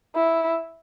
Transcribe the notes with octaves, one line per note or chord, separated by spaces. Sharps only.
E4